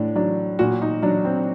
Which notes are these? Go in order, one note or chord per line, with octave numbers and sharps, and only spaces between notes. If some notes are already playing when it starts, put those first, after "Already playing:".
Already playing: A2 D4
F#3 D4
A#2 F#4
D#4
F#3 D4
C4